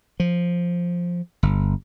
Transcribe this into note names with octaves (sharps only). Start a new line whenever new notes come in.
F3
G1